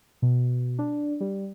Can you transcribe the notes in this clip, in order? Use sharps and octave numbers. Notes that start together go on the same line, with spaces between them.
B2
D4
G3